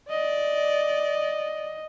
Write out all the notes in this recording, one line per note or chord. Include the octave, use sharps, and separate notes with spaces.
D5 D#5